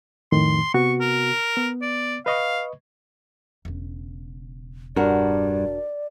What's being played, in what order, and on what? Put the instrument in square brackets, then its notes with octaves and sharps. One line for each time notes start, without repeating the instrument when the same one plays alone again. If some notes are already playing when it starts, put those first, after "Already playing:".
[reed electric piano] F2 A2 D#3 [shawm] C6
[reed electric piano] C3 B3 F#4 [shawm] C#6
[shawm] A#4
[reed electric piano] B3
[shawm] D5
[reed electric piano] B4 D#5 C#6 [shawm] F5
[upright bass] E1 C#3
[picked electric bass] G2 [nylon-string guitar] D4 F#4 A#4 [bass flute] D5